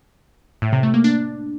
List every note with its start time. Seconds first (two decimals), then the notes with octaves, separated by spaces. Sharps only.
0.62 A2
0.73 C3
0.83 A3
0.94 A#3
1.04 D4